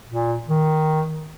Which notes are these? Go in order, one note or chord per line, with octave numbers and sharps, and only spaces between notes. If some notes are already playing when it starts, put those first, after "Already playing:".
A#2
D#3